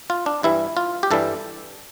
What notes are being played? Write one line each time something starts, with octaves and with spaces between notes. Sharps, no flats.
F4
D4
G2 E3 G3 E4
F4
G4
G2 E3 G3 A4